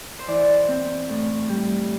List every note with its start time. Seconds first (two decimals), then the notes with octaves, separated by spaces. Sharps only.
0.19 C5
0.27 E3 D5
0.68 C4
1.09 A2
1.49 G3